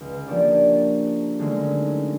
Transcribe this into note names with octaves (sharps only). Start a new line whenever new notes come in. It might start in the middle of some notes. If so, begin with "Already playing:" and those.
C#2
F3 A#3 D4 G4 C#5 D5
D3 D#3 F#3 G#3 A3 C#4